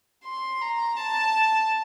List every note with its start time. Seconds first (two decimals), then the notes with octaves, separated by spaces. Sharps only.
0.25 C6
0.61 A#5
0.97 A5